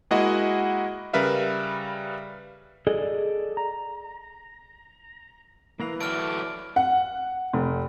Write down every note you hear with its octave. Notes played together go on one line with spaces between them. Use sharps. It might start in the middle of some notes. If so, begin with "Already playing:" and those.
G#3 A#3 E4 F#4 D#5 F#5
C#3 G3 A#4 B4 E5 F5
G#4 A4 D5 D#5
A#5
E3 A#3 A#4 F5
F#3 A3 A4 D5 F6 D7
F#5
F1